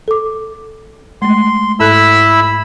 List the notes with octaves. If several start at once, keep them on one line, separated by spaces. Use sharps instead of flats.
A4 D6
G#3 A3 C6
G#2 E4 A4 B5 E6 F#6